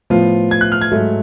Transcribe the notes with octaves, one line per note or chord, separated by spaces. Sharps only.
A2 F3 B3 F4
G#6
F#6
F6
G#6
G#2 F#3 A3